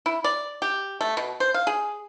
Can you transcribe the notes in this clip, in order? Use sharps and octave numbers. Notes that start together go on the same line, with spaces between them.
E4
D5
G4
A3
B2
C5
F5
G#4